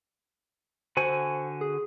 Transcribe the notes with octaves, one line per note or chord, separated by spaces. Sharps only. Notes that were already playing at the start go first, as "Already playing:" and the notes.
D3 F#4 C5 G#5
G#4